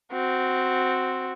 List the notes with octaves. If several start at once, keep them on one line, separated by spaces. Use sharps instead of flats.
C4 F#4